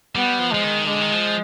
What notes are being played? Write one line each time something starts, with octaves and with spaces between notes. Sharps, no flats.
G3 B3
F3
F3 G#3
D#3
D3 G#3
D#3
F3